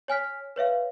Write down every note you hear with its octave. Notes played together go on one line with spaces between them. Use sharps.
C#5 G#5 F6 B6
B4 C#5 E5 F5